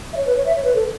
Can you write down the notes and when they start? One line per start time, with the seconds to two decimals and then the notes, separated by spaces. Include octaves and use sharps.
0.13 E5
0.17 C#5
0.26 B4
0.37 C#5
0.46 E5
0.56 C#5
0.65 B4
0.75 A4